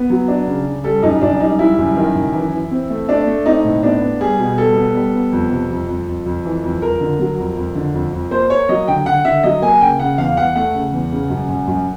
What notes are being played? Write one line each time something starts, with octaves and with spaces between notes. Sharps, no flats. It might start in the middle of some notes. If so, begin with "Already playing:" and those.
Already playing: B3
F#3
D4
C#3
C#3
G3 A4
F#2 D#4
F#2 D4
G3 D#4
G3 E4
F#2
D#3
F#2
E3
E3
C4
A3
A3 D4
A3
C4 D#4
A2
B3 D4
B3
G3 G#4
B2
G3 A4
B3
G3
B3
F2
C3
F2
F2
F2
F2
E3
F2
F2 A#4
D3
F#3
F2
F2
D3
F2
F2
A#3 C5
A#3 C#5
F#3 D#5
D3 G5
D3 F#5
D3 E5
F#3 D#5
A#3 G#5
C#3 G5
C#3 F#5
E2 F5
E2 F#5
A3 F#5
C#3
E2
C#3
F#2
F#2
F#2